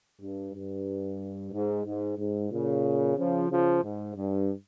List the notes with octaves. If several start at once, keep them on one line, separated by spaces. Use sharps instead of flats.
G2
G2
G#2
G#2
G#2
A#2 C#3
C#3 F3
C#3 F3
G#2
G2